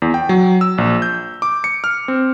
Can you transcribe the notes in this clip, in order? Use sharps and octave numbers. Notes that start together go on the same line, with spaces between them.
E2
G5
F#3
E6
A#1
G6
D6
C#7
F6
C4